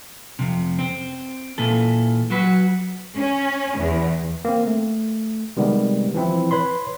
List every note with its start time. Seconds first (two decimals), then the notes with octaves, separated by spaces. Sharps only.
0.39 F2 C3
0.79 C4
1.58 A#2 E3 A4
2.30 F#3 F#4 B4
3.16 C#4
3.76 E2
4.45 A#3 C4
4.67 A3
5.57 C3 D#3 G3 G#3 B3
6.15 E3 F3 C4 E4
6.51 B4 C#5 B5 C6